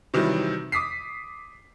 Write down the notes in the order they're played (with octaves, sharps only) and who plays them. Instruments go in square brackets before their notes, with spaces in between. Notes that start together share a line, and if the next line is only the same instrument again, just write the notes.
[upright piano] C3 D#3 E3 F#3 G3
D6 D#6 B6 C7